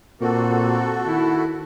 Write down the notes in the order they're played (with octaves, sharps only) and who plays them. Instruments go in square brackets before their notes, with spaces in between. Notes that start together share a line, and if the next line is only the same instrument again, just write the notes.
[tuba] A#2 [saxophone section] A#3 C4 [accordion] F#4 A4
[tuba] D#3 [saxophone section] E4